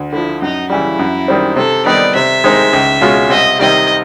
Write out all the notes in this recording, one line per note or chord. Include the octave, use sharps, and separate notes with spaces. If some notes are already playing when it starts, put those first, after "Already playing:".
Already playing: D2
D3 F3 E4
F#2 D#4
C#3 E3 G3 E4
F#2
D#3 G3 C4
C3 A4
D#3 G3 B3 D#4 D5
C3 E5
D#3 G#3 C4 D#4
C#2
B2 G#3 C#4 F4
C2 D#5
C3 D#3 G3 D#5